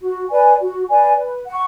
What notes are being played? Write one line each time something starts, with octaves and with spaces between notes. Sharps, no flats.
F#4
B4 D5 G#5
F#4
B4 D5 G#5
B4
F#5 C#6